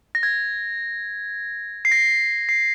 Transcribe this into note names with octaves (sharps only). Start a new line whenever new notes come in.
A#6
G#6
C7
A#6
C7